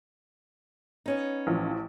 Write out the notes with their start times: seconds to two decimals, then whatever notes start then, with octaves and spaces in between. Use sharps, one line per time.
1.06 B3 C#4 D#4
1.47 A1 F3